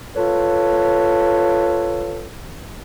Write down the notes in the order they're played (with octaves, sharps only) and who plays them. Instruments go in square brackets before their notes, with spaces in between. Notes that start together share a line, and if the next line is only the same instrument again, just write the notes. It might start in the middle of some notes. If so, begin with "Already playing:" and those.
[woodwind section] F4 A4 B4 C#5